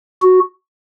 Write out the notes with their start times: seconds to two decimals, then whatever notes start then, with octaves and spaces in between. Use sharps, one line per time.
0.22 F#4